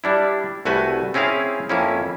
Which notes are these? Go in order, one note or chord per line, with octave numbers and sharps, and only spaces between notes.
G3 D4 E4
C2 A3 F#4 B4 G#5
C4 C#4 E4 G#4 F5
F2 A#3 C#4 E4